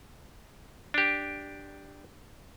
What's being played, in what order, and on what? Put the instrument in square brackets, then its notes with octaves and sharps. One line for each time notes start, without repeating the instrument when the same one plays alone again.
[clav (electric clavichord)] D4 G4